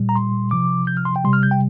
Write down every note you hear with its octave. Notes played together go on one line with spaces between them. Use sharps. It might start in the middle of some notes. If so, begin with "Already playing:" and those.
Already playing: A#2 G3
A#5
C6
C3 F3 D6
G6
F6
C6
G5
C3 G3 C6
F6
G6
G5